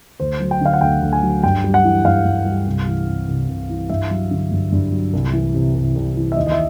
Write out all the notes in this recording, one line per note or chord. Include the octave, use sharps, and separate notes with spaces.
D2 C5
F#3
G5
D3 F5
F#5
D2 G5
D2
G#5
F#3
G2 G5
G3
F#5
E3
G2 F5
G2
G3
C2
E3
C3
C2
C2
E3
G2 E5
F#3
D3
G2
G2
F#3
C2
E3
C3
C2
C2
E3
E5
D#2 D#5
D#5
E5